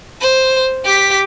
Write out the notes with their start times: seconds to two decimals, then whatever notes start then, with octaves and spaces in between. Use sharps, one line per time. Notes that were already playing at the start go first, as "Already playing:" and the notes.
0.21 C5
0.85 G4 B6